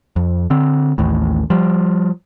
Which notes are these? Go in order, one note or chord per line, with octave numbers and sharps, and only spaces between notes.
F2
D3 C4
A1 D#2 A2
F3 G3